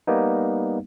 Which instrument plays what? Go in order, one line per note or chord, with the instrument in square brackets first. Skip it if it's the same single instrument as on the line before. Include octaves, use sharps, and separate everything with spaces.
[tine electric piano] G3 A#3 B3 D#4